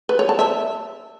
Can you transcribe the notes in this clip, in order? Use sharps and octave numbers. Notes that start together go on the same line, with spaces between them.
B4
C#5
A5
E5